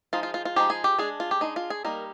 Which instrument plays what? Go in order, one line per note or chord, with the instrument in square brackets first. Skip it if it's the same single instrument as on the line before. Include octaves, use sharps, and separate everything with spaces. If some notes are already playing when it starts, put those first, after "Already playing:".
[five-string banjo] F3 G#3 D#4 F4
F4
F4
F4
F3 G#3 D#4 G4
G#4
G4
G#3 D4 G#4
F4
G4
G#3 D4 D#4
F4
G#4
G3 A#3 D#4 A#4